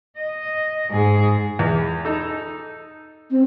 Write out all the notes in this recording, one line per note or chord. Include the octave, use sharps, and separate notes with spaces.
D#5
G#2 G#4
E2
D#4 A4
C4